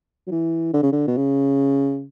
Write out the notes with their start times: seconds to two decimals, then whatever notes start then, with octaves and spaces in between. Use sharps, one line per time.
0.27 F#3
0.31 E3
0.74 D3
0.83 C#3
0.92 D3
1.07 B2
1.17 C#3